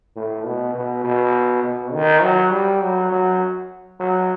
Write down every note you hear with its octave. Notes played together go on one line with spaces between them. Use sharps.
A2
B2
B2
B2
B2
D#3
F#3
G3
F#3
F#3
F#3